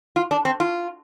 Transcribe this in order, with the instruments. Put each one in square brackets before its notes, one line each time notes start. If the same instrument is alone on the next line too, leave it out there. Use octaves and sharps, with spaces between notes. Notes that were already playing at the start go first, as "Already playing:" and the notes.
[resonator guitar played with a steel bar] F4
D4
C4
F4